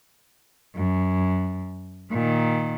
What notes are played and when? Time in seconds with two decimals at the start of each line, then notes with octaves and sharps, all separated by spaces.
0.76 F#2
2.11 A#2 D#3